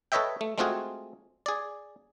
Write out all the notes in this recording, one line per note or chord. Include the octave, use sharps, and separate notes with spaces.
A4 B4 C#5 D#5 E5 G5
A3
G#3 A3 C4 F4 F#4 G#4
G#4 D5